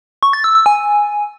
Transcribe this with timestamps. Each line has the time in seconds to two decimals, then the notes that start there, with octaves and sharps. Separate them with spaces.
0.23 C#6
0.33 A6
0.44 E6
0.55 E6
0.66 G#5